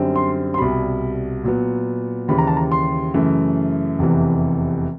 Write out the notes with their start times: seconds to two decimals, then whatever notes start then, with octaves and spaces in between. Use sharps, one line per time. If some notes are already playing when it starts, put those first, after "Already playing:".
Already playing: F#2 D3 G3 C4
0.16 C6
0.54 C6
0.58 C2 B2 G3 B5
1.44 A#2 F#3 B3
2.28 D#2 C#3 E3 G3 B5
2.38 A#5
2.47 A5
2.57 A#5
2.72 C6
3.14 F#2 C#3 E3 A3
3.99 F1 E2 C3 E3